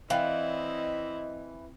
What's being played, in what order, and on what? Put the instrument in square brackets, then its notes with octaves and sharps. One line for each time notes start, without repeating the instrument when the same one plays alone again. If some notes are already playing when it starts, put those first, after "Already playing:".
[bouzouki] E3 [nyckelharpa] C4 E4 [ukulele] D5 F5 G5 [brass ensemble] D#5